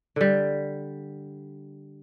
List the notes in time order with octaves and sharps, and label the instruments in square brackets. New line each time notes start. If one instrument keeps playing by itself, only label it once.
[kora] D3 G3